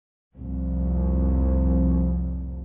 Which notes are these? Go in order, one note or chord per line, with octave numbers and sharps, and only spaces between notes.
C2 F2 A2